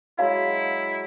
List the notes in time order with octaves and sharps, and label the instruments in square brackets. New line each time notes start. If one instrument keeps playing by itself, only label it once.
[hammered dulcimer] F#3 G#3 B5 [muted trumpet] E4 [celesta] F5